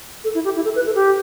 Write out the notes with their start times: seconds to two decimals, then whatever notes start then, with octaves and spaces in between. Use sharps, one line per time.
0.24 A4
0.35 E4
0.45 G4
0.55 E4
0.65 A4
0.76 B4
0.86 A4
0.95 G4